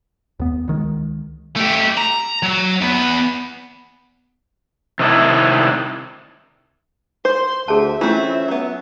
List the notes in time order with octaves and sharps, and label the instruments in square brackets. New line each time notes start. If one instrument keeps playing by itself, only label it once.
[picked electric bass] D#2 B3
C#2 D#3 G#3
[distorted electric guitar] A3 G4
A#5
F#3
E2 B3
[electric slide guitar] C3 D#3 D4 E4
[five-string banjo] C5 [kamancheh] C6
[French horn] D2 [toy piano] G#4 A5 [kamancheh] E5
[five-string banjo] E3 A3 C4 [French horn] C#4 [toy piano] F4
[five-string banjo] F#3 B3